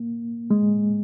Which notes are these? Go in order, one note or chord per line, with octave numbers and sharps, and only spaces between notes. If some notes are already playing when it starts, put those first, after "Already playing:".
Already playing: A#3
G#3